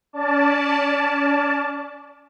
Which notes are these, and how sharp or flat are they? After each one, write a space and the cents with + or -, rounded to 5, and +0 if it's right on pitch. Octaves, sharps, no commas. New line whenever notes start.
C#4 +40 D5 +0 A5 +0